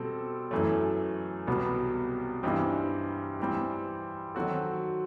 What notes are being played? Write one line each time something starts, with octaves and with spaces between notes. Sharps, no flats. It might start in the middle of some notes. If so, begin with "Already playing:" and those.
Already playing: B2 G3 C4 A4
F#2 E3 A3
C2 B2 G3 B3
G2 E3 G3 C4 D#4
E3 G3 C4
D#3 F#3 C4 F#4 A4